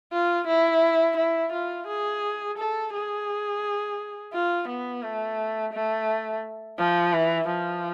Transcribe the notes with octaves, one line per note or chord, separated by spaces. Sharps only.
F4
E4
E4
F4
G#4
A4
G#4
F4
B3
A3
A3
F3
E3
F3